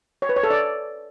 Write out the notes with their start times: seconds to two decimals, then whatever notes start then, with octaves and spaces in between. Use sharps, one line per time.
0.22 C#5
0.29 B4
0.36 C#5
0.43 A4
0.51 D5